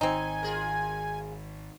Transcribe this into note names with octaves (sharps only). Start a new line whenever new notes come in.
G#1 D#3 C4 D#4 G#5
F4 G#4 A#4